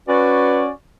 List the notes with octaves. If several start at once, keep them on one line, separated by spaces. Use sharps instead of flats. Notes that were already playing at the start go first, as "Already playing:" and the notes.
C#4 F#4 B4 D5